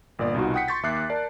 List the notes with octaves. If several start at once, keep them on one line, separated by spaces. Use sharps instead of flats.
G1 A#2 D5 D#6
C2 B2 D#4 F4 F#4
F#5 G5 D#6 G6 B6 C#7
C6 C#6 G6 A6 B6
D#2 E5 D6 F#6 C7
A#4 D5 A5